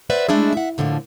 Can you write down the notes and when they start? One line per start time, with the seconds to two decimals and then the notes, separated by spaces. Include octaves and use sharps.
0.10 B4 C5 D5 E5 F#5
0.29 G#3 A3 D4 E4 G#4
0.53 E5 F#5
0.78 A2 D3 F3 A3 A#3